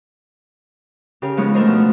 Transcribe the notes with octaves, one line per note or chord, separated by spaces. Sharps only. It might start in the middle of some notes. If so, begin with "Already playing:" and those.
C#3 G4 A#4
F3 G#3 B3 D#4 C#5
A3 D4 A#4 C5 D#5
B2 F3